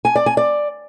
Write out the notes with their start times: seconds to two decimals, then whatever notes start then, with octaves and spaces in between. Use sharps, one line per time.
0.05 G#5
0.15 D5
0.26 G#5
0.37 D5